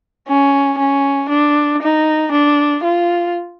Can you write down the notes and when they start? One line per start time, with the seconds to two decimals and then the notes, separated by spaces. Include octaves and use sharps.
0.28 C#4
0.78 C#4
1.29 D4
1.82 D#4
2.32 D4
2.84 F4